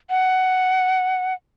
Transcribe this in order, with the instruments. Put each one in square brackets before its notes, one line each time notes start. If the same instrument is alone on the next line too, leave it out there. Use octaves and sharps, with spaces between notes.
[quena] F#5